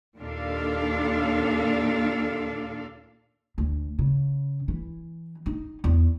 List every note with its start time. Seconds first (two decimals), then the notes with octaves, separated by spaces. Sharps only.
0.17 D#2 A#2 D4 A4 F5
3.58 D2
3.99 C#3
4.68 E3
5.46 D#4
5.84 E2